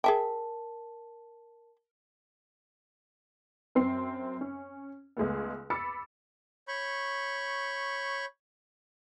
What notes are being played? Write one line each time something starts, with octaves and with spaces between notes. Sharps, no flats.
G#4 A#4 E5 G5 A5
F#2 C4 C6 C7
C#4
C#2 G#3 A3 B3
B5 D6 E6 A6 C#7
C#5 B5 C#6 G6